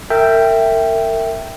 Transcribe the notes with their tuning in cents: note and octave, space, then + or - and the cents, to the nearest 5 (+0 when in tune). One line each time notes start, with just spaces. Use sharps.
A#4 -35 E5 +0 G5 +0